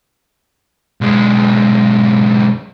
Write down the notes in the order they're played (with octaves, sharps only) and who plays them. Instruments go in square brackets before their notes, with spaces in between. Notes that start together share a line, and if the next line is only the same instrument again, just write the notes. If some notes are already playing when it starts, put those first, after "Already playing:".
[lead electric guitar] B1 G#3